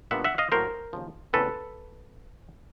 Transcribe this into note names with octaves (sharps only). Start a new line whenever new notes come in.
A#2 G3 B3 D4 E5 F#5
E5 F#5
D#5 F5
A2 F#3 A#3 A#4 C5
D#2 C#3 F3
E2 C#3 E3 A3 C4 A4 B4